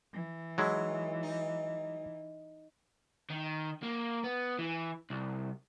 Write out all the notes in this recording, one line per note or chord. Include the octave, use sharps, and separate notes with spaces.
E3
F#3 G#3 D#4 E4
D#4
D#3
A#3
B3
E3
C2